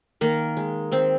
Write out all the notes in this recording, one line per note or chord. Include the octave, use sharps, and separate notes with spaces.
D#3 A#3 A#4
G#3
D#3 C4 C5